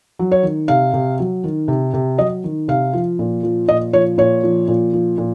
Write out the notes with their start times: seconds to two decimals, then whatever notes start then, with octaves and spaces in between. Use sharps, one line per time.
0.19 F#3
0.32 C#5
0.43 D#3
0.68 C3 F5
0.93 C3
1.19 F#3
1.44 D#3
1.68 C3
1.94 C3
2.18 F#3 D#5
2.44 D#3
2.68 C3 F5
2.93 F3
3.19 A#2
3.43 F3
3.68 A#2 D#5
3.93 F3 C#5
4.18 A#2 C#5
4.43 F3
4.68 A#2
4.93 F3
5.18 A#2